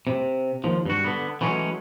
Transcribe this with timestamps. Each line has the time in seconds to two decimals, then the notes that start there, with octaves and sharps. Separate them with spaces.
0.07 C3
0.64 D#2 F3
0.86 G2 F#4
1.04 D3 B3
1.41 E3 F#3 G#3 A3 C#4